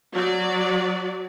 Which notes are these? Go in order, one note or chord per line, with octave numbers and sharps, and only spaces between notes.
F#3 D5